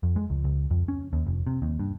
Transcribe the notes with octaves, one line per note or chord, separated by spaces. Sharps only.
F2
G#3
C#2
C#2
F2
C#4
D#2
F1
C3
D#2
G2